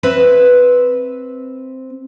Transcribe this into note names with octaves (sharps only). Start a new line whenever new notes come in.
C4 B4 E5